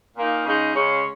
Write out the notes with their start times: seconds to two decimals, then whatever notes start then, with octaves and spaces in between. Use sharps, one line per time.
0.16 A#2 A#3 D#4
0.46 C#3 G#3 D#4
0.74 C#3 G#3 C#4